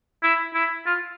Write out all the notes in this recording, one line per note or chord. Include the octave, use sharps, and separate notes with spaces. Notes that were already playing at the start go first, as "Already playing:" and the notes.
E4
E4
F4